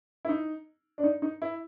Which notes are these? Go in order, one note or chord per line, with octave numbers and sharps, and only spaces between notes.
E4
D#4
D4
D#4
D#4
E4